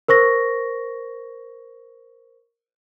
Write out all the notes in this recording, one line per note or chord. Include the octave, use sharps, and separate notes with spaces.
A#4 C5 C#6 A#6